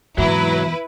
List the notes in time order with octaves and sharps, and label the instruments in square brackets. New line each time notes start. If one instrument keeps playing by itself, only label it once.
[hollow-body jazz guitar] E2 E3 A#5 [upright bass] G#2 C3 [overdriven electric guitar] F#3 [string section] E4 B4